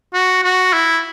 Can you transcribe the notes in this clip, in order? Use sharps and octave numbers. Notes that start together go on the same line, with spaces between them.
F#4
F#4
E4